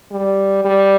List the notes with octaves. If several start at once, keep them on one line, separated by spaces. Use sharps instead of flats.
G3
G3